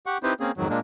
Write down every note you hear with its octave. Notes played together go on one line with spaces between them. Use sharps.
G4 F#5 C#6
C4 D#4 E4 G4 B4 C5
A#3 C4 C#4 G#4
F2 G#2 D#3 F#3
A#2 G#3 A#3 D4